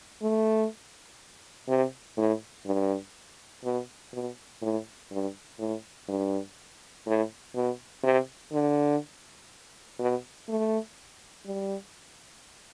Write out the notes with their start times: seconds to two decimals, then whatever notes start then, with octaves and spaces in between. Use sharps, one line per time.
0.22 A3
1.68 C3
2.17 A2
2.66 G2
3.64 B2
4.13 B2
4.62 A2
5.11 G2
5.59 A2
6.09 G2
7.07 A2
7.55 B2
8.04 C3
8.52 D3
9.99 B2
10.49 A3
11.46 G3